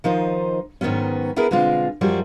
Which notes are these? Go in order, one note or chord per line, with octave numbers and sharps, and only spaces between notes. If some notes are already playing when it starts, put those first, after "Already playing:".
D#3 F3 D#4 C5
G#2 D#3 F#3 B3 C#4
B3 E4 G#4 A#4 B4
B2 D3 G#3 C4 F4
F#2 F3 G3 F#4 G#4